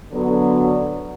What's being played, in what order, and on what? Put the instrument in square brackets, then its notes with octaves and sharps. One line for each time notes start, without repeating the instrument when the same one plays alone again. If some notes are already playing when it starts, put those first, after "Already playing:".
[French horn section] D3 F#3 B3